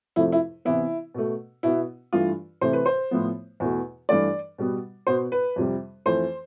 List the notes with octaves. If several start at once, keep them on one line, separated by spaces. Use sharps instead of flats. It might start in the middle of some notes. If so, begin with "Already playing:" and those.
F2 C3 F3 A3 E4
E4
C3 E3 B3 E4
B2 A3
B2 B3 E4
G2 E3 A3 F4
C3 E3 A3 C5
B4
C5
A2 F3 B3
E2 B2 A3
G2 E3 A3 D5
B2 G3 B3
B2 B3 C5
B4
F2 C3 G3
F2 E3 A3 C5